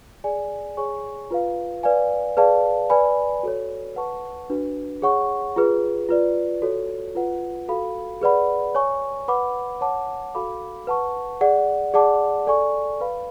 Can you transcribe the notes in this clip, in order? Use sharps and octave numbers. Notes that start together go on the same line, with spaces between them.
G#4 D5 G#5
G#4 C#5 G#5 C#6
F4 B4 F5
B4 D5 F5 G#5
G#4 B4 D5 F5 A5
B4 D5 G#5 B5
F#4 A4 C#5
B4 F#5 A5 C#6
D4 F#4 B4
G#4 C#5 F#5 C#6
F4 G#4 B4
F4 B4 D5
F#4 A4 C#5
F4 B4 F#5
F#4 A4 F5 B5
G#4 B4 D5 F#5 B5
C#5 G#5 C#6
B4 F#5 B5 D6
C#5 F#5 A5 D6
F#4 A4 F5 B5 D6
B4 F#5 A5 C#6
G#4 D5 F#5
G#4 D5 F#5 A5 D6
A4 D5 G#5 C#6
B4 F5 B5